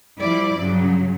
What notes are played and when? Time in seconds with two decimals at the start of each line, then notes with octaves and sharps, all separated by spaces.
0.18 F3 G3 E4 D5
0.59 G2 C#3 F#3